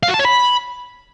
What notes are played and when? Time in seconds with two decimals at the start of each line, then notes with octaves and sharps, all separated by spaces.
0.03 F5
0.09 F#4
0.14 A5
0.19 C#5
0.25 B5